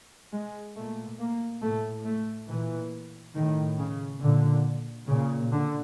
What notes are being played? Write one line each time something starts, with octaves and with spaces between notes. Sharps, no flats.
G#3
A#2 A3
A#3
A2 A3
A3
A#2 E3
A2 D#3
C#3
A#2 D3
A#2 C#3
D3